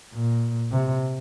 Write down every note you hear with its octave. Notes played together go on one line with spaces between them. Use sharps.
A#2
C3